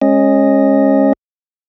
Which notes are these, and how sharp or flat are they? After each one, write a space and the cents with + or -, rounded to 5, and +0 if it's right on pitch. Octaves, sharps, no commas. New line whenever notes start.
G#3 +0 C#4 -20 D#5 +0